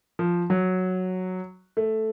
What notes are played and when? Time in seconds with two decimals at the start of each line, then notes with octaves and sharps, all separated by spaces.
0.19 F3
0.50 F#3
1.77 A3